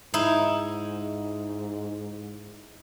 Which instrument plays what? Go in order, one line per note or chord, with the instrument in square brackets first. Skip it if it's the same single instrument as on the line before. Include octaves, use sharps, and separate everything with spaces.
[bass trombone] G#2 [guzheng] D#4 E4